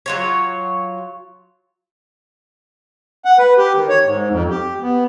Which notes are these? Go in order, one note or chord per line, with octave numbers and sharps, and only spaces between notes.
F#3 F4 C#5
F#5
B4
G4
D#3
C#5
G#2
F2
G4
B3